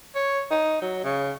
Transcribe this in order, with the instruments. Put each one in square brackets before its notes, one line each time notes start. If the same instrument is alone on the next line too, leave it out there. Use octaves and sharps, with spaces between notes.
[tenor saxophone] C#5
D#4
F#3
C#3